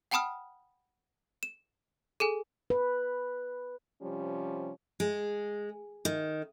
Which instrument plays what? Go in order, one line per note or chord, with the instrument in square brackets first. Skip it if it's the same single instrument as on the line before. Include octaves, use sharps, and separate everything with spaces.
[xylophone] F#5 G5 A5 B5 D#6 F6
E7
G#4 A4 G#5
[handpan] B4
[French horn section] C3 F3 G3 C#4
[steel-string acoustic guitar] G#3
D#3